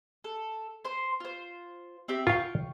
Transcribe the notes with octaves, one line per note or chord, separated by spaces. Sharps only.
A4
C5 C6
F4 C5
C4 G4 E5
F4 F5 G5 C#6